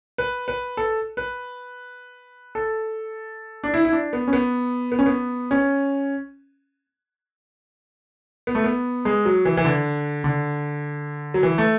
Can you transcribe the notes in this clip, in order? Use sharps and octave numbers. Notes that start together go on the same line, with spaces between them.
B4
B4
A4
B4
A4
D4
E4
E4
D4
B3
C#4
B3
B3
C#4
B3
C#4
B3
A3
B3
G#3
F#3
E3
E3
D3
D3
F#3
E3
A3